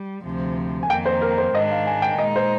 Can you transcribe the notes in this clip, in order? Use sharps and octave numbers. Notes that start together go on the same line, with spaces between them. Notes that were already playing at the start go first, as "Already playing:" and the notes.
Already playing: G3
D2 C3 F3
G#5
F2 D#3 A#3 G5
C5
A#4
C5
G#2 D#3 G#3 D4 D#5
F5
G#5
G5
A#2 G#3 D#4 D#5
C5